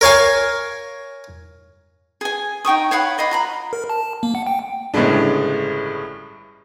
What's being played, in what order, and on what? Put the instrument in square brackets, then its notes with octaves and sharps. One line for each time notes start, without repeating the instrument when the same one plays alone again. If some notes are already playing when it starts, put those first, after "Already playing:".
[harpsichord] A#4 C#5 F5 G#5
[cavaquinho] G#4 G#5
D#4 G5 C#6 D#6
C#5 F5 F#5 B5
D5 D#5 F5 B5
F4 A#5 B5
[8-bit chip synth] A#4
A5
A#3
F#5
G5
[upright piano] G1 A2 C#3 G3 G#3 D4